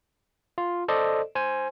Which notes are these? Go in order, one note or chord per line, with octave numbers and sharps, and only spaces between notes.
F4
A4 C5 D5 D#5
C5 G#5